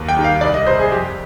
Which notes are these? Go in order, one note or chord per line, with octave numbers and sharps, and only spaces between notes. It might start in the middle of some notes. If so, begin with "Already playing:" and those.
Already playing: D#2
G5
D#3 G3
F5
C2 D5
D#5
C3 G3 C5
G#4
F2 G4